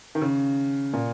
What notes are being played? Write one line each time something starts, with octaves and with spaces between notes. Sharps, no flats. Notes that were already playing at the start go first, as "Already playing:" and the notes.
D#3
C#3
A#2